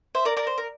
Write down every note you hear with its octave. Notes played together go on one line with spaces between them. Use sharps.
C5 E5
A#4 D5
A#4 D5
C5
A#4